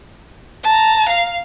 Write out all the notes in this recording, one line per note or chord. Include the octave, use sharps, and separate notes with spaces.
A5 A#5
F5